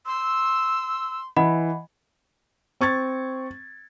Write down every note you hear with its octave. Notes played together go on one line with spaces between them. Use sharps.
C6 E6
E3 D#5 F#5 B5
C4 C#6 G#6 A6